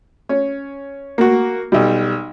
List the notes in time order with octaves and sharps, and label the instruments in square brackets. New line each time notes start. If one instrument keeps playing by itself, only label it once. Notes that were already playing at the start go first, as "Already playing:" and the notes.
[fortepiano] C#4
A#3 F#4
B1 G3